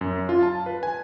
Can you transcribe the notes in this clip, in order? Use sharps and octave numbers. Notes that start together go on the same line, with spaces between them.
F#2
F4
A5
B4
G#5